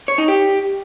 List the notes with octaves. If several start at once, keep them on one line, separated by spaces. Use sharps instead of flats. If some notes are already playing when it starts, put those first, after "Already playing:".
C#5
D#4
G4